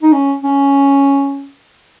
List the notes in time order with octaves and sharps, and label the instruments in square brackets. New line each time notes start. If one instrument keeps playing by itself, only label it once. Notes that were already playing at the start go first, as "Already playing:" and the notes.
[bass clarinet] D#4
C#4
C#4